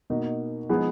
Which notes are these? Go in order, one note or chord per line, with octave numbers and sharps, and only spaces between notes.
B2 A#3 D#4 F#4
F3 G#3 B3 D#4 G#4